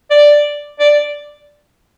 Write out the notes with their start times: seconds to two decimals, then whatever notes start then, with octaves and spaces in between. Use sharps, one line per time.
0.11 D5
0.80 D5